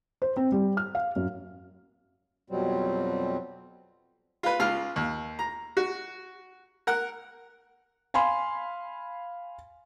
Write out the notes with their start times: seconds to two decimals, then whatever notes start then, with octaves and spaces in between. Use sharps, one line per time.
0.22 C5
0.37 C4
0.52 G3
0.77 F6
0.95 F5
1.16 F#2
2.50 F2 B2 F#3 G3 C4
4.43 F4 B4
4.59 C#2 F4 F6
4.96 D#2
5.39 A#5
5.77 F#4
6.87 A#4 F#5
8.14 F5 G#5 B5 C6